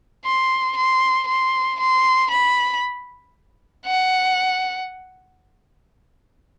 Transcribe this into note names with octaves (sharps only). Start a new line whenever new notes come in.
C6
C6
C6
C6
B5
F#5